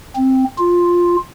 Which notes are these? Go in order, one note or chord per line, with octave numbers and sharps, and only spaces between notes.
C4
F4